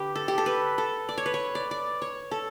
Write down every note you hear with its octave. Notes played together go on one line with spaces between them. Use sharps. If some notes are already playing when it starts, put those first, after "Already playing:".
Already playing: D3 G4 B4
A4
G4
A4
B4
A4
D5
C#5
B4
C#5
D5
D5
C#5
A4